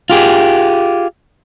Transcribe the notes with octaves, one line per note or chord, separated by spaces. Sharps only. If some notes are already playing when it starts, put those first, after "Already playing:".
F4 G4 G#4